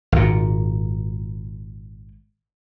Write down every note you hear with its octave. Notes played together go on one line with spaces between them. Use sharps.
G#1 A#2